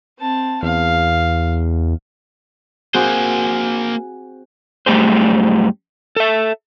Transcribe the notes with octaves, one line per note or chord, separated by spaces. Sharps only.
C4 A5
E2 F5
A#3 C4 F#4 G#4 C5
F#2 G3 A3 G4 G#4 C5
A4 E5